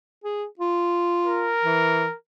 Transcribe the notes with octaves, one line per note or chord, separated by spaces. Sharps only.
G#4
F4
A#4
E3